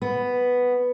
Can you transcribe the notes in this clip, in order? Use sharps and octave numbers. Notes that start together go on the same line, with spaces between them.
B3